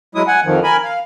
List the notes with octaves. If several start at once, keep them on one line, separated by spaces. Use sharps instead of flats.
F#3 G#3 E4 D#6
F#5 G#5
F2 D#3 F3
A#4 G#5 B5
F5